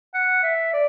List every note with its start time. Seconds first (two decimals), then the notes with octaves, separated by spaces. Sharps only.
0.14 F#5
0.43 E5
0.73 D5